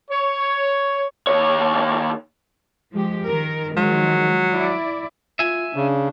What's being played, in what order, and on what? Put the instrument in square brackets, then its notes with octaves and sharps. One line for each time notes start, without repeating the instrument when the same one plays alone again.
[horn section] C#5
[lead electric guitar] D#2 C#5
[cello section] F3 G#3 G4
D#3 A#4
[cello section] D#3 F3 G#3 [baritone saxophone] F#3
[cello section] E4 D5
[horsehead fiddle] F4 [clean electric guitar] E5 G#5
[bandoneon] C#3 [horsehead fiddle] D4